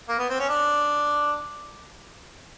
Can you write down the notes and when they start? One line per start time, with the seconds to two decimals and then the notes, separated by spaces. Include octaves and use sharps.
0.08 A#3
0.19 B3
0.29 C4
0.39 C#4
0.49 D4